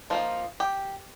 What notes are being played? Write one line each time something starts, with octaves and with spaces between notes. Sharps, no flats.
F3 A#3 D#4 F4
G4